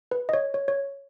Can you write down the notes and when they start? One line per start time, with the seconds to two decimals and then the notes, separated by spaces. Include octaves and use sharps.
0.11 B4
0.29 D#5
0.33 C#5
0.54 C#5
0.68 C#5